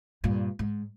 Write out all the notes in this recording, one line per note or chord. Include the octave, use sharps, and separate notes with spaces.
G2 A#2
G#2